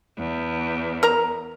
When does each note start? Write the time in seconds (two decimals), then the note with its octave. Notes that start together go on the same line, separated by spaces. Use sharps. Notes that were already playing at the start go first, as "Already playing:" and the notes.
0.19 E2
1.03 A#4 A#5